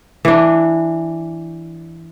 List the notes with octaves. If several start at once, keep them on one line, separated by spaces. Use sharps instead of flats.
E3 D4